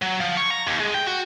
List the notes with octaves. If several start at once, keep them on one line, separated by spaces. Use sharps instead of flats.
F#3
F3
C#5
A#5
D#2
G#3
G5
F#4